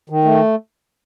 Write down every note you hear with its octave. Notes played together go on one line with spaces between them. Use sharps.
D#3
A3